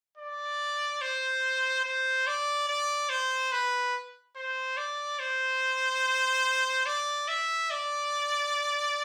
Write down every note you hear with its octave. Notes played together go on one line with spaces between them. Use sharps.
D5
C5
C5
D5
D5
C5
B4
C5
D5
C5
D5
E5
D5